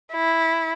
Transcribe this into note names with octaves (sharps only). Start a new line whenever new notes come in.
E4